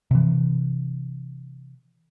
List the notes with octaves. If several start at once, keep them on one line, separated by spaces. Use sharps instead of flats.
C3 E3